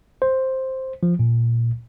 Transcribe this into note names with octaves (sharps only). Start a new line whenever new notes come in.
C5
F3
A#2